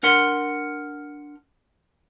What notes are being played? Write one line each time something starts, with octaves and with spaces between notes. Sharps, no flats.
D4 A#4 F#5 C6